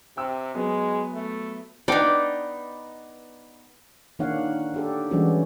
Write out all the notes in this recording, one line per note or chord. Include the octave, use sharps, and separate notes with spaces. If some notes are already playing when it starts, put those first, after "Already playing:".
C3 G5 E6
F#3 G#3 B3
A3
B3 D4 D#4 D5 G5
D#3 A#3 D4 C#5 F5 F#5
D4 G4 A4
E3 G3 G#3 C#4 D4 F#4